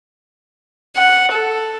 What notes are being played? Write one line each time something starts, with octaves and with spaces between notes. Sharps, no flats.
F#5
A4